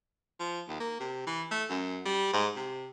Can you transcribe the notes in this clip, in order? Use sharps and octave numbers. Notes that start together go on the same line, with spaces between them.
F3
D#2
A#3
C3
E3
A3
F#2
G3
G#2
C3